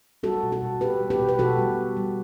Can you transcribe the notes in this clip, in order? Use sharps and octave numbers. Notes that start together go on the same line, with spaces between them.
G3 F#4 A4
B2
F#4 A4
B2
G3 G4 B4
G3
G4 B4
B2
B4
B2 F#4 A4
G3
G3
G3